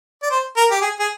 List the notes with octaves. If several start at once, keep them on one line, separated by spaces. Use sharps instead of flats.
D5
C5
A#4
G4
G#4
G#4